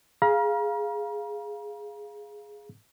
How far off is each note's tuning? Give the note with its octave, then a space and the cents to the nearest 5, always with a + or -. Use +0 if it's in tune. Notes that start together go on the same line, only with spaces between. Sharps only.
G#4 +0 F5 +0 A#5 +40